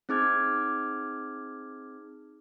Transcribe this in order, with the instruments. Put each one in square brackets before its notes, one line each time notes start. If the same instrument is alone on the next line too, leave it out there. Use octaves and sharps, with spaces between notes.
[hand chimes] C4 D#4 G#4 D6 F6 G#6